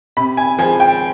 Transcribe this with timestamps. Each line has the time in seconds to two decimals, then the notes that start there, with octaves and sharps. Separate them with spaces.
0.17 C3 B5
0.37 G#5
0.59 F3 G#5
0.63 G#3
0.80 G5